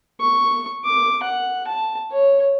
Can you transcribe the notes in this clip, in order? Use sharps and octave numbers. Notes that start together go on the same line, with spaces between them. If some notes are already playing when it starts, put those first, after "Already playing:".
C#6
D6
F#5
A5
C#5